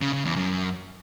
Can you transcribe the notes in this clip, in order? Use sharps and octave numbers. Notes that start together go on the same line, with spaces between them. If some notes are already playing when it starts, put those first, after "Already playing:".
C#3
C#3
E2
F#2